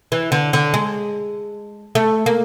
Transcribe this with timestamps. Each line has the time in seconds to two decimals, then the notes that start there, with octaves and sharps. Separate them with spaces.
0.12 E3
0.32 D3
0.53 D3
0.74 G#3
1.95 A3
2.26 A#3